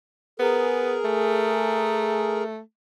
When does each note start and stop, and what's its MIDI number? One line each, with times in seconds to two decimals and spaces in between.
0.40 0.97 59
0.40 2.44 68
0.40 2.44 70
1.05 2.60 57